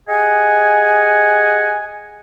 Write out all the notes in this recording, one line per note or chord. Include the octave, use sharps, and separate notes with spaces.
G4 G#4 D#5 F#5 G#5